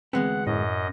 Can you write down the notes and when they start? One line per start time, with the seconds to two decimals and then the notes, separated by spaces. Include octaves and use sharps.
0.13 D2 E3 G#3 B3 C4 F#5
0.47 F#2 A2 D#5